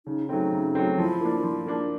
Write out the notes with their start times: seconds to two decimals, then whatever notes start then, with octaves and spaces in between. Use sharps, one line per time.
0.06 C#3 D#4
0.28 F#3 A3 C4 D#4
0.52 C#3
0.75 F#3 A3 C4
0.97 F3 E4
1.21 A#3 D4
1.43 F3
1.66 A#3 D4